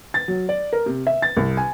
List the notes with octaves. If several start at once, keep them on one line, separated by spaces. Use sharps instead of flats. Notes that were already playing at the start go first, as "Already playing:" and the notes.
A6
F#3
D5
A#4
C3
E5
A6
C2
G#5